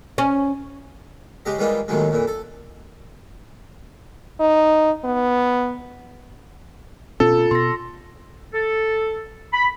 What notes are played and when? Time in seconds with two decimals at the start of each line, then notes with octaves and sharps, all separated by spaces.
0.18 C#4
1.46 C#3 G#3 G4 D#5
1.58 E3 G3 G#3 A#3 D#4 F4
1.88 D#2 A2 D#3 F#3 G#3
2.11 F2 A#2 E3
2.28 A4
4.40 D#4
5.05 B3
7.20 B2 C4 C#4 F4 A4
7.51 B2 C6 A#6
8.54 A4
9.53 B5